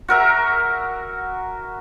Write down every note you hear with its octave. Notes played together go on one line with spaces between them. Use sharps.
F#4 A#4 E5 A#5